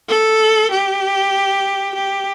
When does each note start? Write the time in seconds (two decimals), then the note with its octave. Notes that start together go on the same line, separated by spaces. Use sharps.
0.09 A4
0.71 G4
1.95 G4